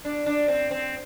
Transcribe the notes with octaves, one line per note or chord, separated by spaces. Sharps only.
D4
D4
C4
C4